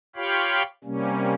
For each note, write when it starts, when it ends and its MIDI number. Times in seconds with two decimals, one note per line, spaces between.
0.16 0.63 65
0.16 0.63 67
0.16 0.63 73
0.16 0.63 77
0.16 0.63 79
0.16 0.63 83
0.84 1.34 48
0.84 1.34 55
0.84 1.34 58
0.84 1.34 61